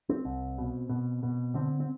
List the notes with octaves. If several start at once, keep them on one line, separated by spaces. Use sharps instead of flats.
C4
C2
B2
B2
B2
D3 C4
C4